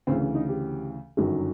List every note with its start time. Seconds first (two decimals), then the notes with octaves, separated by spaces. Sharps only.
0.07 D2 C#3 E3 C4
0.21 C#4
0.35 D#4
0.49 G4
1.17 G1 F#2 D#3 F#3